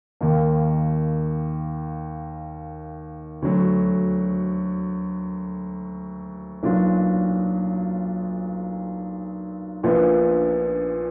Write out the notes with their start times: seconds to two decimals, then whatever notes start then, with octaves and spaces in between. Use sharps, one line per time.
0.21 D#2 D#3 A#3
3.42 D2 D3 F#3
6.63 B1 A#2 F#3 D4 F4
9.83 A#1 A#2 F3 B3 D4